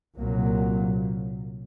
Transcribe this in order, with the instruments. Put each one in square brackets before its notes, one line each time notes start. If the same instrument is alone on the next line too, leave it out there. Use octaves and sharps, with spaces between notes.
[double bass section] C2 A#2 F#3 A#3